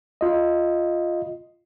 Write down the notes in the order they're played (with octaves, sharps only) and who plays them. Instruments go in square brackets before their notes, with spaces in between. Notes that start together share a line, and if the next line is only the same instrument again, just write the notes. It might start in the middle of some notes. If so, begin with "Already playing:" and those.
[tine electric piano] F4 D#5